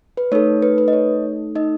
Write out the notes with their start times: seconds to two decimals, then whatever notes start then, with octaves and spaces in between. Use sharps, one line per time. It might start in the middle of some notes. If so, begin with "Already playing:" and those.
0.17 B4
0.32 A3 D#4 A4 C#5
0.62 B4
0.78 B4
0.88 D#5
0.93 C#5
1.55 D#4 D#5